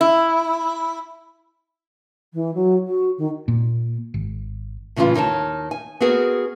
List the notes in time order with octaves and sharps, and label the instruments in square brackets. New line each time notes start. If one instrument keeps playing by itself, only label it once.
[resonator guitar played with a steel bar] E4
[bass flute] E3
F#3
F#4
D#3
[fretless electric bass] A#2
G#1
[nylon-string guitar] A2 C#3 E3 G3 F4 F5
D#2 D#4 A#4 C#5 A5
G#5
B3 C4 F#4 G#4 A#4